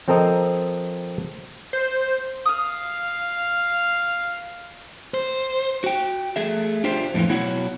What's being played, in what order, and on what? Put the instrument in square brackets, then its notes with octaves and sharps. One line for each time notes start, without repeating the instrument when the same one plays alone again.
[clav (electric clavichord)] F3 C4 A4 A#4 D#5
[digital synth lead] C5
[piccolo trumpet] F5 [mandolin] D#6 F6
[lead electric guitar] C5
[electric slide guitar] F#4 G5
A3 G#4 E5
D4 F4 G4 C5
F2 A2 D3 E3 F4
B2 F#3 E4 F#4 F#5